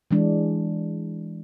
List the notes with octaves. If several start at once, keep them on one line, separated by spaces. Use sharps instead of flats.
E3 G#3 D4